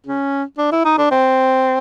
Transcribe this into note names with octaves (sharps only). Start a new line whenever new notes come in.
C#4
D4
E4
D#4
D4
C4